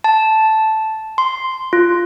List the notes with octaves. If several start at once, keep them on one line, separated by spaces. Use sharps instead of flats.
A5
C6
F4